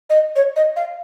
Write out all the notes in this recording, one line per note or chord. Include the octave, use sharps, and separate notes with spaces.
D#5
C#5
D#5
F5